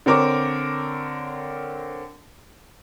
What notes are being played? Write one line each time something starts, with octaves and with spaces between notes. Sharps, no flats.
D3 C4 A#4 C#5 D6